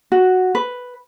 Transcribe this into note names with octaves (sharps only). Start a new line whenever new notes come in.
F#4
B4